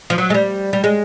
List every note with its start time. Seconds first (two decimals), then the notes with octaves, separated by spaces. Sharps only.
0.10 F3
0.18 F#3
0.30 G#3
0.34 G3
0.73 G3
0.84 G#3